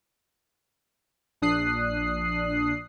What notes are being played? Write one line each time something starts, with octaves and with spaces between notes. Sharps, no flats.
A#1 D4 D#6 F#6 C7